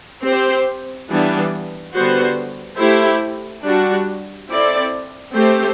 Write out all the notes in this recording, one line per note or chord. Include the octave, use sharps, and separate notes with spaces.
C4 G4 C5
E3 G3 B3 D4
D3 G3 B3 F#4 C5
A3 E4 G4 C5
G3 D4 F#4
C4 E4 A4 D5
A3 C4 G4 C5